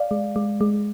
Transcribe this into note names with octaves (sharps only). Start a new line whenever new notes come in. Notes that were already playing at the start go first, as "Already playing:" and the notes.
Already playing: D5 F5
G#3
G#3
G#3